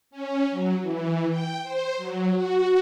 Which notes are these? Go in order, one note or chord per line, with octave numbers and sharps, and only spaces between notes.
C#4
F#3
E3
G5
C5
F#3
F#4